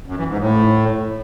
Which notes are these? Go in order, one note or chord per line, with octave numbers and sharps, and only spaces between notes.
F#2
E3
G#2
A2